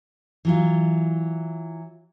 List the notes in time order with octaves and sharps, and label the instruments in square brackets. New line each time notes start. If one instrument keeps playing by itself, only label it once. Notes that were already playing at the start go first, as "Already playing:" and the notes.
[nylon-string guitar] E3 F#3 F4